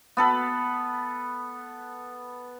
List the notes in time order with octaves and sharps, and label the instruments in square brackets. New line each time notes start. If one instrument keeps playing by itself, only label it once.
[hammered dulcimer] B3 A4 B4